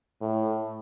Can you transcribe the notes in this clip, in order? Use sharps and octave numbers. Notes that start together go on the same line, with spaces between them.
A2